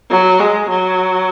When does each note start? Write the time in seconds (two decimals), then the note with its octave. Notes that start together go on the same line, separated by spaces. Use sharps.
0.10 F#3
0.40 G#3
0.69 F#3